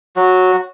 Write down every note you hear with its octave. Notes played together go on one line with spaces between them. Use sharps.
F#3 F#4